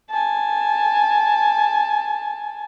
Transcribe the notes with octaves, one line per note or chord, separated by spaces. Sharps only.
G#5 A5